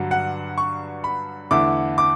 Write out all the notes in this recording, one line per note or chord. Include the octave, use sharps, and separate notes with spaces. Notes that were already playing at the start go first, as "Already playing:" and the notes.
Already playing: G2 D3 F#3
F#5
C#6
B5
E2 D3 A3 E4 D6
D6